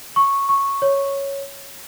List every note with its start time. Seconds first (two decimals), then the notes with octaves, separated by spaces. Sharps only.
0.16 C#6
0.49 C#6
0.82 C#5